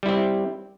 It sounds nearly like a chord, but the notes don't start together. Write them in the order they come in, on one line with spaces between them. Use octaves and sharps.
G3 E4 C4